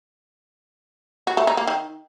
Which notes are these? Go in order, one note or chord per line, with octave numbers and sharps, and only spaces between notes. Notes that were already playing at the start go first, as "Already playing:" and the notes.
F#4
A3
D#4
A#3
D#3